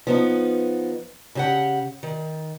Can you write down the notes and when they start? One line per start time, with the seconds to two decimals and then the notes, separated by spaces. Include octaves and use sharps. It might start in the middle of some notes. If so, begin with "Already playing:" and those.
0.07 F3 B3 D#4
1.35 C#3 G4 F#5
2.03 D#3